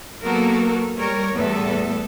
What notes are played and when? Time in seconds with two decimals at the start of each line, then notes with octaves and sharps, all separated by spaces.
0.23 F#3 A#3 B3 F#4 A4 A#4
0.97 G3 A#4 C#5
1.34 E2 A2 G3 B3 A4 E5